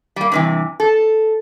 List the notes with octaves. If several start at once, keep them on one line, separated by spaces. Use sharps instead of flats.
G3 A#3
G2 C3 E3
A4